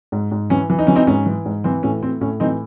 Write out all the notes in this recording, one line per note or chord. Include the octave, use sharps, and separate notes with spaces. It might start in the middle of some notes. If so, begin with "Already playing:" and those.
G#2
G#2
E3 C#4
E3
D#4
E3 C#4
C4 D#4
G#2 C#4
E3
G#2
E3 C4
A2 C#4
A2 C4
A2 C#4
E3 C4 D#4